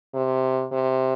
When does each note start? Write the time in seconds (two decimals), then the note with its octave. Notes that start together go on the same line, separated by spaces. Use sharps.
0.14 C3
0.72 C3